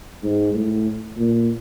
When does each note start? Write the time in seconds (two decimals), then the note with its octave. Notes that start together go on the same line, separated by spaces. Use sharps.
0.24 G#2
0.54 A2
1.17 A#2